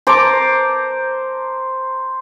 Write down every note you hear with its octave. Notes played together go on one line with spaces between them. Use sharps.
C5 A5 A#5 D6